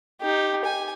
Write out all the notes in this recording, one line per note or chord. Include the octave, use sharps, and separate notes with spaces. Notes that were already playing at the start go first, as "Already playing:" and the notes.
D#4 G4
G#5